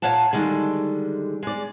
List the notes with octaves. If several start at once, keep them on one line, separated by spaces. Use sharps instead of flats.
A#2 C#5 F5 F#5 A5
D3 D#3 G3 G#3
G#3 D5